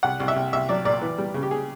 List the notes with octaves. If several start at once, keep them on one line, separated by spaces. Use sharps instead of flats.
C2 F#5
C2
E5
C2
C2 E5
F#3 D5
A#2 D5
E3
G3
C#3
G4
G#4